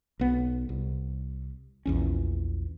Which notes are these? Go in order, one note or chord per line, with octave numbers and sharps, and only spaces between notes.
B1 B3
C2
A#1 E2 C#4